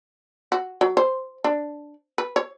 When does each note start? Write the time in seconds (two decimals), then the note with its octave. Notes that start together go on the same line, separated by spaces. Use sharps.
0.52 F#4
0.81 F#3
0.97 C5
1.44 D4
2.18 B4
2.36 C#5